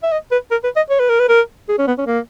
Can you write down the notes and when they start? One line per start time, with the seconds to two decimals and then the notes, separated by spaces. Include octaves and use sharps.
0.03 E5
0.12 D#5
0.31 B4
0.51 A#4
0.64 B4
0.76 D#5
0.90 C#5
1.00 B4
1.09 A#4
1.19 B4
1.29 A#4
1.69 G#4
1.79 C#4
1.88 B3
1.98 C#4
2.07 A#3